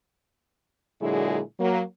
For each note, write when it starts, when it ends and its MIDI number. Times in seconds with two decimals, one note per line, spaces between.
1.01 1.40 46
1.01 1.40 50
1.01 1.40 54
1.01 1.40 56
1.01 1.40 64
1.01 1.40 68
1.59 1.81 54
1.59 1.81 58